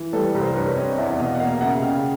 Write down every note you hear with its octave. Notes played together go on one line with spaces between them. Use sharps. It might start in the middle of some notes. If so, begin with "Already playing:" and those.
Already playing: E3
G3 A4 B4
C2
A#4 C5
G2 B4 C#5
C4 C#5 D#5
E2 D5 E5
B2 D#5 F5
F#5
A#3 D#5 F5
C#3 E5 F#5
C#3 F5 G5